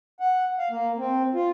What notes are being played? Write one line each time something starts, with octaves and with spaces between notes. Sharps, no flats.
F#5
F5
A#3
C4
F4